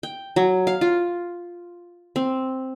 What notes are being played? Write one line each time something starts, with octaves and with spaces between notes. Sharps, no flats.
G5
F#3
F5
F4
C4